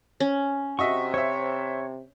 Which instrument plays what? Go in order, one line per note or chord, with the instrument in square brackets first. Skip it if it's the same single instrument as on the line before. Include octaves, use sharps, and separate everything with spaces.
[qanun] C#4
[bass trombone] C3 [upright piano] F#4 D#5 E5 [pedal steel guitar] C#6
[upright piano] C5 E5 [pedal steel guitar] C#5